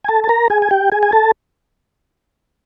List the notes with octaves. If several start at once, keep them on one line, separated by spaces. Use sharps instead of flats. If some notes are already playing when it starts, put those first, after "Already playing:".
G#5
A4 A5
A5
A#4 A#5
G#4 G#5
G#5
G4 G5
G#4 G#5
G#5
A4 A5